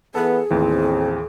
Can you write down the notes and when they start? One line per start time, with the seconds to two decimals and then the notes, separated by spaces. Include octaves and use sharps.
0.15 E3 B3 G#4 A4
0.50 A1 D#2 A2 E3 C4